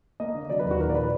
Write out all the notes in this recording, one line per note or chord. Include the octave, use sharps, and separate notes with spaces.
A#3 D#5
D3
F#3 D5
B4
D#2
F#4
A#2 A#4
D5
F3 B4